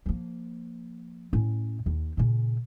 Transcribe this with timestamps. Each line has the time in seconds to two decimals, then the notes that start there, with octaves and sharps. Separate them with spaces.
0.06 F3 A#3
1.33 A2 C#4
1.86 D#2
2.17 A#2 C#3